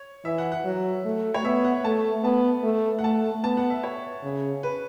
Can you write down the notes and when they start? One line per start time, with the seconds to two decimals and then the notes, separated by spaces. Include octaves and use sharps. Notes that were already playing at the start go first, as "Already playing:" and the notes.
Already playing: C#5
0.25 E3 E5
0.38 F#5
0.52 F#5
0.65 F#3
1.05 A3
1.34 C#5
1.44 B3 E5
1.64 F#5
1.84 A3 A5
2.24 B3 A5
2.64 A3
2.99 F#5
3.04 A3 A5
3.44 B3 A5
3.57 F#5
3.70 E5
3.83 C#5
4.24 C#3
4.63 B4